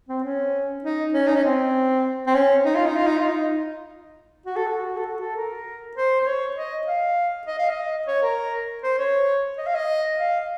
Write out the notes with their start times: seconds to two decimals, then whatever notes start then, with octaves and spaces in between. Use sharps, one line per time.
0.09 C4
0.24 C#4
0.84 D#4
1.14 C#4
1.27 D#4
1.36 C#4
1.44 C4
2.27 C4
2.35 C#4
2.65 D#4
2.75 F4
2.86 D#4
2.96 F4
3.07 D#4
3.17 F4
3.29 D#4
4.46 F#4
4.56 A4
4.67 F#4
4.97 A4
5.06 F#4
5.21 A4
5.36 A#4
5.97 C5
6.21 C5
6.26 C#5
6.57 D#5
6.87 F5
7.47 D#5
7.59 F5
7.70 D#5
8.07 C#5
8.23 A#4
8.83 C5
8.98 C#5
9.58 D#5
9.66 F5
9.75 D#5
10.19 F5